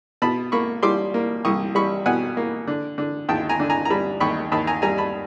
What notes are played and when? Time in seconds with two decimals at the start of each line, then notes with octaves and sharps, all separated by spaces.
0.22 B2 A5 B5
0.52 A#3 B5 C#6
0.83 G3 C6 D6
1.14 A#3
1.45 C2 C#6 D#6
1.75 G3 B5 C#6
2.06 B2 F#5 G#5
2.37 A#3
2.67 D3
2.98 D3
3.29 D#2 G5 A5
3.49 G#5 A#5
3.60 D3
3.70 G#5 A#5
3.85 A#5
3.90 G3 A5 B5
4.20 D#2 B5 C#6
4.52 D#2 A5 B5
4.67 G#5 A#5
4.82 G3 G#5 A#5
4.98 A5 B5